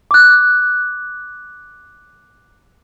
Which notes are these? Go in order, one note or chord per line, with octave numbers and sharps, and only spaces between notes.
D6 F#6